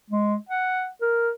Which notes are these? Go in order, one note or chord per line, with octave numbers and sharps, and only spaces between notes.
G#3
F#5
A#4